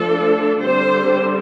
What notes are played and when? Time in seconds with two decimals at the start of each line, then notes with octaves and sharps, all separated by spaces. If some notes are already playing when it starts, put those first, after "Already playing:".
Already playing: F3 A3 D4 A4
0.62 D3 G3 C4 C5